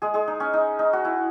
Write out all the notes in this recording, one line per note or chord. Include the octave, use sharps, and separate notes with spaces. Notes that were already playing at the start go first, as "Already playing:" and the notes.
G#3 G#4
G#3 G#4
D#4
C#4
D#4
D#4
F#4
E4